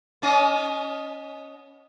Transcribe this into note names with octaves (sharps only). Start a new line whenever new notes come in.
B3 C#4 D#5